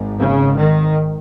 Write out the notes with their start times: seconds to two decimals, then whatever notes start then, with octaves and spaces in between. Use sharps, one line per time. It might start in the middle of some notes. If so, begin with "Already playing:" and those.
Already playing: G#1 G#2
0.19 C#3
0.57 D#3